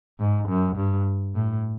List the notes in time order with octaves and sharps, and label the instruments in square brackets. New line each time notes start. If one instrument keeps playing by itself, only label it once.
[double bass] G#2
F#2
G2
A2